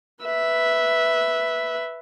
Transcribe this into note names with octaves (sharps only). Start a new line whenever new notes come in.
B4 E5